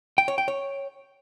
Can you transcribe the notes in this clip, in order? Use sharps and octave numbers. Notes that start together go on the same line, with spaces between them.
G5
C#5
G5
C#5